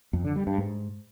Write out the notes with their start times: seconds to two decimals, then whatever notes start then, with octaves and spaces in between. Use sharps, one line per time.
0.13 F2
0.24 D3
0.36 G3
0.47 G2
0.58 G#2